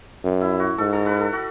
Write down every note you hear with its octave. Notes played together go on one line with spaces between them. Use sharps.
F#2
E4
F#4
G#2 A4
A4
B4
A4
F#4